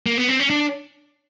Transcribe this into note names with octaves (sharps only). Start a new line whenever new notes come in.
A#3
B3
C4
C#4
D4